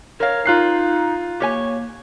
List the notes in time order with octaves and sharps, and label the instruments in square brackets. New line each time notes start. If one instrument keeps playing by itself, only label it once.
[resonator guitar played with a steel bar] A#4 F5 [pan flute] C#5
[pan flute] D#4 [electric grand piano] F4 F#6 C7
[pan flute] A#3 [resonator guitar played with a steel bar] G4 C#5 G#5